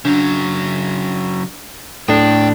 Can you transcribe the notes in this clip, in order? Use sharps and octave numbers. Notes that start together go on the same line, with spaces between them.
C#3 F#3 D4
D#2 A2 D4 A4 G5